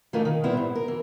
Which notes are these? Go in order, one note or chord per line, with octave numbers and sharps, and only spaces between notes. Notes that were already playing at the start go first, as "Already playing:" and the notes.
E3 A3 C#4 D#4 F4 A#4
D#3
A#2 G3 B3 C4 E4
G#2
A#4
E3